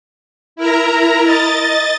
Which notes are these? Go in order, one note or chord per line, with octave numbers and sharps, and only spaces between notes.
E4 A#4 A#5
D#5 A6